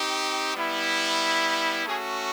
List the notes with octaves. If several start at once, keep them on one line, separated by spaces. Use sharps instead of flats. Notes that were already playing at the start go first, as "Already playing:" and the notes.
Already playing: C4 D#4 G4
G3 B3 E4
A3 C#4 F#4 G#4